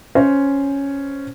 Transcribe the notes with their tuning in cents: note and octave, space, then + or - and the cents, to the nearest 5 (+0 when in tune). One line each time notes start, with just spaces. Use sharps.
C#4 +0 C5 +0